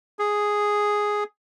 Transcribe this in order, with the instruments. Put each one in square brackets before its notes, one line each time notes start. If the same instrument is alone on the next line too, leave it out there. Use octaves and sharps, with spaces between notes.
[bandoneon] G#4